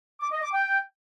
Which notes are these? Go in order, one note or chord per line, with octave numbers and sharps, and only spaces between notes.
D6
D#5
D6
G5